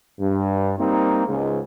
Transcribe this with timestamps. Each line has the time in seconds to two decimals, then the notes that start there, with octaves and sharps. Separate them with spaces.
0.20 G2
0.79 G3 A#3 C4 D#4
1.28 C#2 G#2